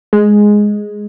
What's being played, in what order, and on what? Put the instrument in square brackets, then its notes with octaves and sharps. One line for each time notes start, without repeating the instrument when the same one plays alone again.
[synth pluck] G#3